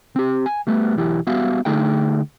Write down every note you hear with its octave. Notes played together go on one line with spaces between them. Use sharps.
C4 G4
G#5
G3 A3 B3
B1 E2 E3 E4 G4
G3 B3 F#4 E5 F5
D3 A3 D#4 G#4 E5 G5